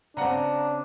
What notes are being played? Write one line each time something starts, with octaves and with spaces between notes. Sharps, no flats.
C#3 C4 D4 F#5 A#5